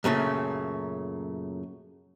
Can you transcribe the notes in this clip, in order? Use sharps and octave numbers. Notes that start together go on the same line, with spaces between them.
F#2 A#2 C#3 A3